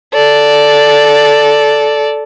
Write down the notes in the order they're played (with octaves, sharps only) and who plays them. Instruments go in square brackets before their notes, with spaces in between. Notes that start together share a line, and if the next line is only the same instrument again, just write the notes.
[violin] A4 D5